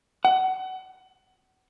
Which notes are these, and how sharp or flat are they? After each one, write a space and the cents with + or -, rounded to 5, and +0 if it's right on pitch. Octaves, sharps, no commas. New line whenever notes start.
F#5 +30